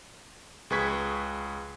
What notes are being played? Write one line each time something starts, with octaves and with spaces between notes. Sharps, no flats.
C#2 G#4 B4 C#6 G#6 B6